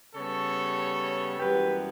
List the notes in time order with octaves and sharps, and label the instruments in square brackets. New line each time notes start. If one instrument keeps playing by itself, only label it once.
[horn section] C#3 G3 B3 A4 C#5
F#2 E3 G3 B3 G4 B4